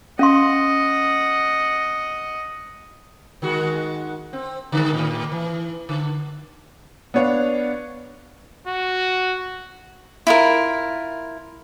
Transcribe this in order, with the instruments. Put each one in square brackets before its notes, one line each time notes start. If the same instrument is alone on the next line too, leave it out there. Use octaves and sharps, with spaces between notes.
[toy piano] C#4 F5 C6 [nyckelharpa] D#5 F#5
[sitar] D#3 G#3 F#4
C4
D3 D#3 G#3
A2
E3
D3
[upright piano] B3 D4 C#5 F5
[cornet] F#4
[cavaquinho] E4 F4 A#4